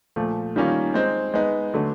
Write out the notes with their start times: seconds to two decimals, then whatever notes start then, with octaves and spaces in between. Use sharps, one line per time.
0.16 A#2 F3 A3
0.56 D#3 G3 A#3 C#4 F4
0.94 G#3 C4 D#4
1.34 G#3 B3 D#4
1.74 D3 F#3 A3 D4